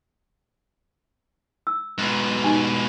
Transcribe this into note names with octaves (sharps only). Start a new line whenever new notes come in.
E6
G#2 B2
D#4 G4 G#5